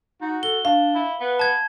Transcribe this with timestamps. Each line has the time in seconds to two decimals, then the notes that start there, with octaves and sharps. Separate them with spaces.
0.21 D#4 F#4
0.43 A4 G7
0.65 D4 F5
0.95 E4
1.20 B3 B4
1.39 A5 G#6